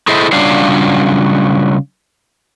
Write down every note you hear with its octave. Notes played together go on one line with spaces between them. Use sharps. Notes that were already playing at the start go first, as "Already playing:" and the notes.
E4 G#4 A4 C5 D#5 E5
C#3 F#3 G3 D4 F4 F5